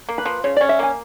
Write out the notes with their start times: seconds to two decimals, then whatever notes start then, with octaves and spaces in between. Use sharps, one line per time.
0.09 A#3
0.18 B4
0.25 F3
0.44 C#3 C#5
0.56 C#4 D5
0.69 E5
0.79 A#3 G#5